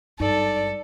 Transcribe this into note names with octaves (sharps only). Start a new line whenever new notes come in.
G#1 G2 D#4 A4 D5